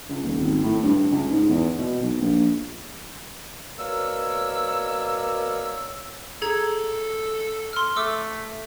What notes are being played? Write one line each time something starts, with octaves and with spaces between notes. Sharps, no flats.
C#2
D#1
G#1
A2
G2
C#2
G#2
E2
B2
B1
A#1
B2 A#3 A#4 C#5 D5 E6
G#4 A4 A#5 G#6
C6 F6
A3 D6 E6